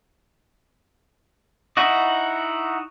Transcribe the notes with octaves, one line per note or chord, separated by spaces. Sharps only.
D#4 E4 F#4 D#5